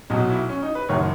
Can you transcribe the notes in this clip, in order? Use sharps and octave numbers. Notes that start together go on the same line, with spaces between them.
B1 B2 F#3 D#4
E4
C#4
D#4
B4
F#1 F#2 D#3 F#3 C#5